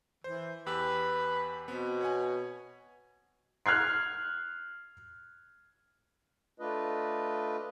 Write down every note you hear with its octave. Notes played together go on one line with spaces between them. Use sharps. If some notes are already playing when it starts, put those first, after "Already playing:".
E3 C5
E2 G4 B4 E6
B2 B3 C4
C#5 F#5 G#5
F6 F#6 G#6 C7
A3 D4 F4 B4 D#5